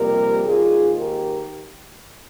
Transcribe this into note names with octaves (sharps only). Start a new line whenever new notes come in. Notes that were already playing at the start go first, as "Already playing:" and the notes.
Already playing: F2 C3 G3 A#3 G4 A#4
G#2 D#3 A#3 F4 G#4
G4 A#4